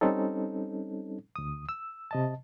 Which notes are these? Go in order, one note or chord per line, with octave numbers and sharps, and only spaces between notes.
G3 C4 C#4 D#4 A4
D2 D#6
E6
C3 D#5 A5